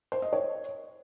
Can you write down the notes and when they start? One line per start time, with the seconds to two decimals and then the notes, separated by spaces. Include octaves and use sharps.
0.12 C5
0.22 D#5
0.33 C#5